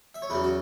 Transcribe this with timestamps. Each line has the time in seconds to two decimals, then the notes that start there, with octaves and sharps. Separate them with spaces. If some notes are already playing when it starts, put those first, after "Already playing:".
0.14 E5
0.22 C#5
0.30 E2 C#3 F#3 B4
0.43 F#4